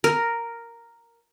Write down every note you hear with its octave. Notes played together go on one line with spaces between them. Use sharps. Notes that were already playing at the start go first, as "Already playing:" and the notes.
A#4